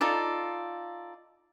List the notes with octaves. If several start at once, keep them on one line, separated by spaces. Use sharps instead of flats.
D#4 F4 A4 D5